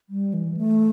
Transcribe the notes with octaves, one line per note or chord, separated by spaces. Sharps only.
G3
E3
A3